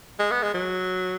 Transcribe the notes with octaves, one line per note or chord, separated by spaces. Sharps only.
G#3
B3
G#3
F#3